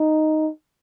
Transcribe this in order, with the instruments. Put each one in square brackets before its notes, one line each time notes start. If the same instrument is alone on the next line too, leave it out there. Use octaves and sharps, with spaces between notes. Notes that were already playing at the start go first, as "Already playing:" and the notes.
Already playing: [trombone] D#4